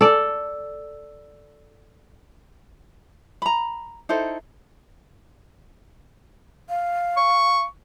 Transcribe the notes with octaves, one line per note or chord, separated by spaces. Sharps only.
A4 D5
A#5 B5
D#4 E4 A4 C5
F5
C#6